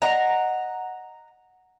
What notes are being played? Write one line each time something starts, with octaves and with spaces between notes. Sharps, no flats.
D#5 F#5 A#5